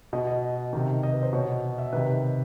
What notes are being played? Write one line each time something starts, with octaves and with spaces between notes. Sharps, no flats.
B2 D#5
D#5
C3 D#3
D#5
B4
C5
B2 C#5
E5
C3 D#3 B4